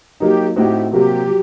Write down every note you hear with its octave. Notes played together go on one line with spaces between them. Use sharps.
F#3 A#3 D#4 G4
A2 A3 C4 D#4 F#4 G4
C3 F#3 A#3 F#4 G4
F#3